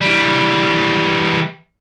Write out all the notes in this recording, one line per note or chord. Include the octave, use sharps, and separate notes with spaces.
E3 G3